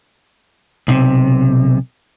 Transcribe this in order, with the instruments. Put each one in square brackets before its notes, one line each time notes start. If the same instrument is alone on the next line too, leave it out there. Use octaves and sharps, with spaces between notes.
[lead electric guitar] B1 C3